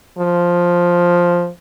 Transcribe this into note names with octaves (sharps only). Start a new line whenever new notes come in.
F3